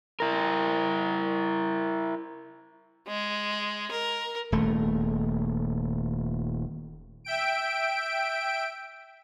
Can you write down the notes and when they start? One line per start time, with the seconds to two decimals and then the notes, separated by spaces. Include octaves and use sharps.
0.20 E4 A#4
3.08 G#3
3.91 A#4
4.52 D#1 A3
7.24 E5 G5 D7